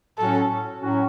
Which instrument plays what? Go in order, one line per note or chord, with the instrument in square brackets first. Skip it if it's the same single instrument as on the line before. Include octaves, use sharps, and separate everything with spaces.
[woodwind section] A2 F#3 C#4 F#4 [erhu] A4
[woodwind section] A2 F#3 C#4 F#4